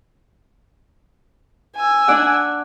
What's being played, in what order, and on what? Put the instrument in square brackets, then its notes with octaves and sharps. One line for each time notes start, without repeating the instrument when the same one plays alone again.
[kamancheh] G#5 E6
[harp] D4 D5 F#5